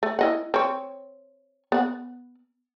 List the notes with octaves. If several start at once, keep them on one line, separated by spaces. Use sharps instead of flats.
A3
E4 D#5 F#5
C4 C#5
B3 F#5